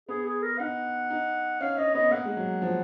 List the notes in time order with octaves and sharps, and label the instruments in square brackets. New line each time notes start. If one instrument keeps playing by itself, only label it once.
[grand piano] B3 [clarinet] G#4
[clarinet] G#4
A#4
[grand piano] D#4 [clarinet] F#5
[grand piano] D#4
[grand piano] C#4 [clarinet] F5
[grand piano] C#4 [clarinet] D#5
[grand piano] B3 [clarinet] D#5
[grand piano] A#3 [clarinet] F#5
[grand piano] G#3
F#3
F3